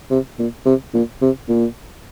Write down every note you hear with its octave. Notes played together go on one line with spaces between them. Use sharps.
C3
A#2
C3
A#2
C3
A#2